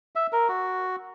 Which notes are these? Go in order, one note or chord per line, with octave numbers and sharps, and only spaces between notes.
E5
A#4
F#4